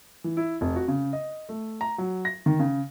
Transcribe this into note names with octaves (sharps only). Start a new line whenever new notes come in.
E3
E4
F1
F#4
C#3
D#5
A3
A#5
F#3
A#6
D#3
C#3